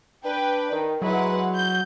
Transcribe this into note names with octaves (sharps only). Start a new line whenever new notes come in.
D4 B4 G5
D#3
F#3 G#3 E4 B4 F#5
G6